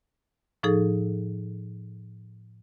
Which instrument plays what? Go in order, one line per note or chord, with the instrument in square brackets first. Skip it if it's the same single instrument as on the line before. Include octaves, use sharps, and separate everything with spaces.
[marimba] A2 F3 D#4 G#4 A4